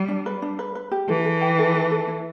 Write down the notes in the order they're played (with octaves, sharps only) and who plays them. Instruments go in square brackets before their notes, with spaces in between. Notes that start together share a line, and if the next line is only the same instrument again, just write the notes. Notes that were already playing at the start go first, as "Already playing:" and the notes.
Already playing: [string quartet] G3
[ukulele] D4
B4
D4
B4
B4
G4
[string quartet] E3 [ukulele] A4
[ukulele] A4
G5
A4
A4
A4
E4